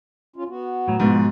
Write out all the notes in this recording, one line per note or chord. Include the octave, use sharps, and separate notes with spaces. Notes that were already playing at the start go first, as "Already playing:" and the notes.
C#4 F4
B3 F#4
A2 F#3 A#5
G#2 B2 F3